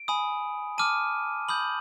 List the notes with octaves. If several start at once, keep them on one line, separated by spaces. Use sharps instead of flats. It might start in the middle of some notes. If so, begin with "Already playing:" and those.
Already playing: D7
G#5 B5 D#6
A5 D6 F6 D#7
B5 D#6 G6 F#7